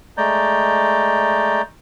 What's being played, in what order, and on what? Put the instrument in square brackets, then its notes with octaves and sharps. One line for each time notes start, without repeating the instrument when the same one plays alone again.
[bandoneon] G#3 A3 D5 A#5 G6